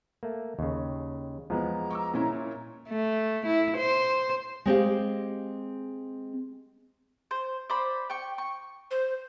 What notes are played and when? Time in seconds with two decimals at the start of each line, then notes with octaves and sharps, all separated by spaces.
0.23 A3 A#3
0.59 D#2 C#3
1.50 E2 F3 G#3 B3 A#5
1.90 C#6 D6 E6
2.14 A#2 C#4 E4
2.90 A3
3.46 E4
3.77 C5
4.66 G#3 C4 G4 F5
7.31 C5
7.70 C5 D5 B5
8.10 G5 C#6
8.38 C#6
8.91 C5